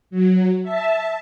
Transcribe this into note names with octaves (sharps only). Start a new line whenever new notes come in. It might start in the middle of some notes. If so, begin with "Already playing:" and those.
F#3
E5 A5